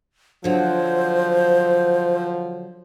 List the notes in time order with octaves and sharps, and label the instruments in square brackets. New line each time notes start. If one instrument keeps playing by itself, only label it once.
[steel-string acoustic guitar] D3 F#3 [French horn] F3 [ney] C5